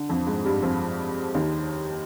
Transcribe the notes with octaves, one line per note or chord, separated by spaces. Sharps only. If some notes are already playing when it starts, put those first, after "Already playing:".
Already playing: D3
F2 F3
G#2 G#3
G2 G3
F2 F3
D#2 D#3